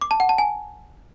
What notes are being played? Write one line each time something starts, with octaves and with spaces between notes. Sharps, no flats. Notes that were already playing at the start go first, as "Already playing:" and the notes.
D6
A5
F#5
A5
G#5